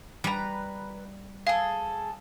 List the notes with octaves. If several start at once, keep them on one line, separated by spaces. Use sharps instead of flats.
G3 B4 A#5
G#4 A4 F5